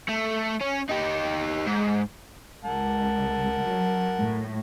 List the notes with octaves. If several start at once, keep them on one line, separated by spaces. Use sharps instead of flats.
A3
C#4
D#4 G4
G#2
C#2 A#4 F#5 A5
F#3
A2